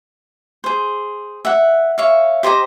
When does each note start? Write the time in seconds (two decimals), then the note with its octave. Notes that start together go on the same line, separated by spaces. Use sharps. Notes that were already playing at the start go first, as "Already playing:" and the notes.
0.64 G#4 C5
1.45 E5 F#5
1.98 C#5 E5 F5
2.43 G4 C5 D#5 A#5